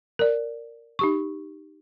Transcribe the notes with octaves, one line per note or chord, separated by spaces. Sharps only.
A#4 D5
D#4 G4 C#6